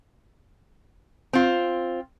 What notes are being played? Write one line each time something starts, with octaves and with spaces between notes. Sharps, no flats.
C4 F4